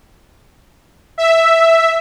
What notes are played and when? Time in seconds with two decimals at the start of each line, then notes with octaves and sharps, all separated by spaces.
1.18 E5